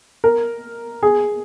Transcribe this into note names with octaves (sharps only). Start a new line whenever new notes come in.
A#4
G#4